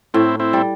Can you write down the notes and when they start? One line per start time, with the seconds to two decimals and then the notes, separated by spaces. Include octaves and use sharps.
0.14 A2 C4 E4
0.40 C4 E4
0.53 G3